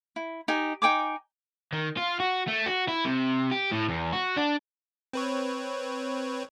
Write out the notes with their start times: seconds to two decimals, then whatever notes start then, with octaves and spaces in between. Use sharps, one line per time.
0.16 E4
0.48 D#4 G4 D#5 G#5
0.82 D#4 G5 G#5 D6
1.73 D#3
1.97 F4
2.20 F#4
2.48 A3
2.66 F#4
2.88 E4
3.05 C3
3.52 G4
3.72 A2
3.89 E2
4.13 F#4
4.37 D4
5.13 C4 B4 C#5